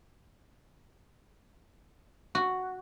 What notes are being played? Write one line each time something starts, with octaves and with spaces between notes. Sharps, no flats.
F#4